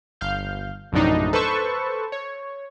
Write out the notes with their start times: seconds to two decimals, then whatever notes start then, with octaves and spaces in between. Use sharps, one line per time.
0.21 G1 F5 F6 G6
0.92 A#1 F#2 A2 C3 D4 D#4
1.33 A4 B4 C5 A5 C#6 E6
2.12 C#5